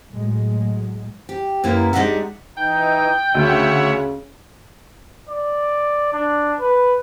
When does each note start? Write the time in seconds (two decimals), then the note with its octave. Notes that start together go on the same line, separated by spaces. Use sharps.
0.11 A2 F#3 G#3
1.29 G4
1.64 F#2 A#3 B3 E4 B4
1.93 G3 G#3 D4 D#4 E5 F#5
2.57 E3 D#4 G5
3.35 D2 C#3 C#5 E5 F#5
5.29 D5
6.13 D4
6.60 B4